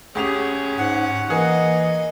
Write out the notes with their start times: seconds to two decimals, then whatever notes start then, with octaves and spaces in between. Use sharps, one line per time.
0.15 D2 C#4 G4 G#4 F7
0.78 G#2 F#5
1.30 E3 A#3 G#4 D#5